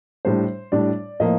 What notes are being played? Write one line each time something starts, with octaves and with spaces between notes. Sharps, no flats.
A2 G3 D4 C5
A2 G3 D4 D5
A2 F3 A#3 D#5